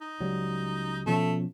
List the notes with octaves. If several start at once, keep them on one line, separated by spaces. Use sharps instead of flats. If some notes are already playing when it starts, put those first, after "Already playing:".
D#4
C#2 F#3 G3
B2 F3 A3 C#4